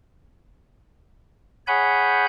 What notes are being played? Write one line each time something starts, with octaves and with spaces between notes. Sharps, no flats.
G#4 C#5 F#5 G#5 B5 G6